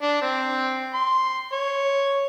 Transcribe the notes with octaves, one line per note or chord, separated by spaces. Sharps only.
D4
C4
C6
C#5